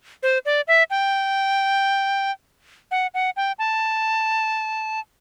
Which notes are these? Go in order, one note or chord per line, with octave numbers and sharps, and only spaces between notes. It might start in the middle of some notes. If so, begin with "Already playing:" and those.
C5
D5
E5
G5
F#5
F#5
G5
A5